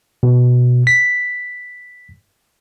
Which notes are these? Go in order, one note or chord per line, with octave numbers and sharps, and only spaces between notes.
B2
B6